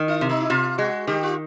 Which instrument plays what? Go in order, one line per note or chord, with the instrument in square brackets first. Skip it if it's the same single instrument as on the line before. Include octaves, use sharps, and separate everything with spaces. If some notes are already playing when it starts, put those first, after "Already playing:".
Already playing: [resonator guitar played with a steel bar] D#3
[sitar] E4
[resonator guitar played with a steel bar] C3
[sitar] D#4
E4
[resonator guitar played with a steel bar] C3 [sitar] F4
[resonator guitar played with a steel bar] G#3 [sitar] F#4
[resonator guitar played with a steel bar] D#3 [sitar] G4
[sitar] F4